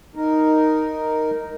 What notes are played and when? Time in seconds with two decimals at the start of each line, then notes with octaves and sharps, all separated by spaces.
0.15 D#4 A#4